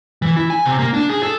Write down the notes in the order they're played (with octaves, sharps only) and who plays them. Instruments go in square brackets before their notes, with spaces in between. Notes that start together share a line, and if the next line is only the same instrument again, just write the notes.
[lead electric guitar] E3
E4
G#5
C3
A#3
D4
G#4
A4